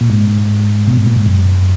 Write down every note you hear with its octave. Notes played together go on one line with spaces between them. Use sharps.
A#2
G#2
B2
G#2
A#2
G#2
F#2